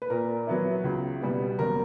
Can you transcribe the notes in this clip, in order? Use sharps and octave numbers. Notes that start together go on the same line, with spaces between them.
B4
A#2 A#4
F#3 B3 E4
C#2
B2 G3 B3
F#1 A#4